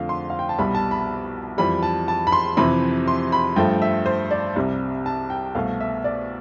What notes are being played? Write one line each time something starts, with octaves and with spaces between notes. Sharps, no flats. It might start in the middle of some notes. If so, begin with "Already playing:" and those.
Already playing: F2 D3 A3 F5
C6
F5
G5
A5
C2 B2 G3 B5
A5
B5
F2 E3 G3 B5
A5
A5
B5
C6
F2 C3 E3 B5
C6
B5
G2 F3 A3 G5
E5
C5
D5
C2 C3 G3
A5
G5
C2 B2 A3 F5
E5
D5